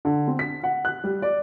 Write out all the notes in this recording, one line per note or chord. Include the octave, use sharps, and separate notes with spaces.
D3
C4
B6
F#5
F#6
G3
D5